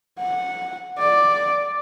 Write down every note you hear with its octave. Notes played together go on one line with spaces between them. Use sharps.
F#5
D5